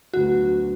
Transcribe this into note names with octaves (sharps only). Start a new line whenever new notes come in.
D2 D3 F#3 B3 F#4